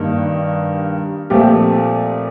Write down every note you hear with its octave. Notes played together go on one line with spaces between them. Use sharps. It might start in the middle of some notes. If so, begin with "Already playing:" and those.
Already playing: G2 D#3 A#3 D#4
A#2 F3 A3 C4 G4